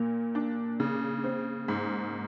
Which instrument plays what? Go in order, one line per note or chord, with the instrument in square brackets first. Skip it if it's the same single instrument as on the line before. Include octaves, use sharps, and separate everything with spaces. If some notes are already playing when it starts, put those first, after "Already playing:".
Already playing: [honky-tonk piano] A#2 [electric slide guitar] A#3
[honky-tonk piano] D4
C#3
C4
G#2